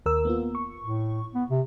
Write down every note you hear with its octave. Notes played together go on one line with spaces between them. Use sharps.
D#2 A#4 E6
A#3 B3 F4
C#6
A2
B3
C3